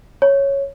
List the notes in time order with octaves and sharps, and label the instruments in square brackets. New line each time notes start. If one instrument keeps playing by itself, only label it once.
[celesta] C#5